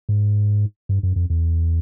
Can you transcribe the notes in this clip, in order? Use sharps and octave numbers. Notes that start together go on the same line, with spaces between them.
G#2
G2
F#2
F2
E2